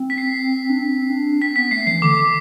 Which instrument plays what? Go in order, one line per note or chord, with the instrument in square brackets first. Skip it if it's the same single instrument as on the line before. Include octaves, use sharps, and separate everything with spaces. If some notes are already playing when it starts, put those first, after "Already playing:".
Already playing: [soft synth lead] C4
[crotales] B6
C7
[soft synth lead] D4
C4
D4
[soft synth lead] C4 [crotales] B6
[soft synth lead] C4
[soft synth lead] B3 [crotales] B6
[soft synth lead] A3 [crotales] C7
[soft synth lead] E3 [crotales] C7
[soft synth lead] D3 [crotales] D6
[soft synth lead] D3